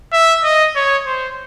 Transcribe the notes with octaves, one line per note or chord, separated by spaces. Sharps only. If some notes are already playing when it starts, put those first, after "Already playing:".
E5
D#5
C#5
C5